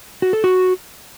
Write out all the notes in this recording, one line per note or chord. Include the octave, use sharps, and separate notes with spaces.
F#4
A4
F#4